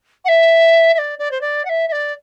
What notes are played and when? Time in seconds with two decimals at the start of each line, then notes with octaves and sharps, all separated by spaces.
0.25 F#5
0.28 E5
0.94 E5
0.98 D5
1.19 D5
1.31 C5
1.41 D5
1.65 F#5
1.69 E5
1.88 E5
1.92 D5